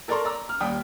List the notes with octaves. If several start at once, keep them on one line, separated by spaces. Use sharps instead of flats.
A4 A#4 D5 A#5 C6 C#6
D5 A#5 D6 E6
F6
D#2 G3 G5 D#6